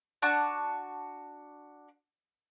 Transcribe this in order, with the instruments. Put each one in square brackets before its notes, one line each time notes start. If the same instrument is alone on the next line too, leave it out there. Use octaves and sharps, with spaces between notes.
[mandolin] D4 F#4 A5